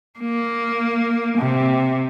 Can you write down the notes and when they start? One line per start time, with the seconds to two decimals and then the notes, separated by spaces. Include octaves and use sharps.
0.19 A#3
1.38 C3